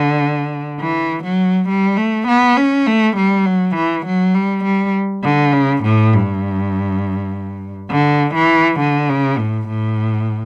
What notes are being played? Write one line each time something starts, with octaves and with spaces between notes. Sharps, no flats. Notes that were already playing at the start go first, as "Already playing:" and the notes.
Already playing: D3
E3
F#3
G3
A3
B3
C#4
A3
G3
F#3
E3
F#3
G3
G3
D3
C#3
A2
G2
D3
E3
D3
C#3
A2
A2